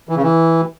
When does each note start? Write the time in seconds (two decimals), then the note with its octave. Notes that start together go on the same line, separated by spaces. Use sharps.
0.09 E3
0.16 C#3
0.23 E3